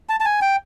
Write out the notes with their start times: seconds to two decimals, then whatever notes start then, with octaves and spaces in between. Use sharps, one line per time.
0.09 A5
0.20 A5
0.25 G#5
0.42 G5